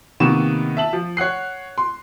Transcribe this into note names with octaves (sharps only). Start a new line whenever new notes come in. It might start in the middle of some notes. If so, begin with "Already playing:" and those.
C3 D#3 A#3 B3 C#6 E7
E5 A5 F#7
F3
C#5 F#5 F#6 C7
C6